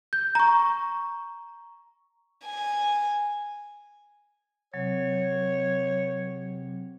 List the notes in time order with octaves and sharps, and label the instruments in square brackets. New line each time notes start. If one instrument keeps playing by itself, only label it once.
[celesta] G6
A#5 C#6
[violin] G#5
[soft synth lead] C3 [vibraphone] F#3 [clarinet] C#5